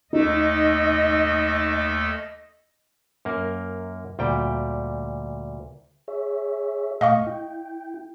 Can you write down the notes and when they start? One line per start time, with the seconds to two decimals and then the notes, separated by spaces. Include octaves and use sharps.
0.13 D#2 A3 D#4 A4 D#5
3.25 F#2 A#3 A#4
4.19 D2 A#2 G3 G5
6.08 G#4 C#5 E5
7.01 A#2 A3 D#5 F5 C#6
7.27 E4 G5